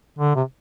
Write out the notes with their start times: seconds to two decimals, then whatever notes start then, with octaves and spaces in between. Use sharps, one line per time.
0.19 D3
0.36 C3